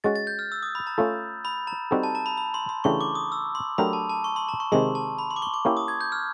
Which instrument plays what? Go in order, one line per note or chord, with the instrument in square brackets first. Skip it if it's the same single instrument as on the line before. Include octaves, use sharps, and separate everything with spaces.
[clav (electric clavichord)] G#3 C#4 F#4 [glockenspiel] A6
[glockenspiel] A6
G6
F6
E6
D#6
B5
A#5
[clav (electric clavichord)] A3 C#4 F4 A4
[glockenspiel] B5
A#5
[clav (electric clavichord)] G3 C4 D#4 F#4 A4
[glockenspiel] A5
A#5
B5
B5
C6
C6
[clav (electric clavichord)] C#3 E3 A3 D4 G4 [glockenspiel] C#6
[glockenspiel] D6
D#6
E6
C6
[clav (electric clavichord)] F#3 A3 D4 G4 A#4 [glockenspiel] B5
[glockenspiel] A5
A5
C#6
C6
A#5
C#6
[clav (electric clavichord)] C3 D#3 G#3 [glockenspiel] C6
[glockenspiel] A5
B5
C6
D6
C#6
D6
[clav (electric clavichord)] A#3 C#4 E4 G4
[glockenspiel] D#6
G#6
G6
F6